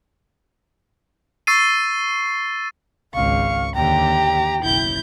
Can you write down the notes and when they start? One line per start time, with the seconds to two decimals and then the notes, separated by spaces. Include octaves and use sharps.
1.47 C#6 E6 A6 C7 D#7
3.14 G#1 C#2 F5 C#6
3.75 D#2 D3 G4 G5 A#5
4.63 F#1 B1 E4 G6